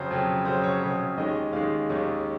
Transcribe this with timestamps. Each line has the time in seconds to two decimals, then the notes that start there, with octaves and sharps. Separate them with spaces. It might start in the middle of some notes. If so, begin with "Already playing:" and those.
Already playing: F2 C#3 F#3 C5
0.11 F2 C#3 F#3
0.45 F2 C#3 F#3 C5
0.63 C#5
0.81 F2 C#3 F#3
1.17 D#2 D#3 G#3 C#4 D#5
1.53 D#2 D#3 G#3 C#4 F5
1.89 D#2 D#3 G#3 C#4